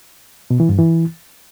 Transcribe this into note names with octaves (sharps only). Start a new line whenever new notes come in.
B2
E3
G2
E3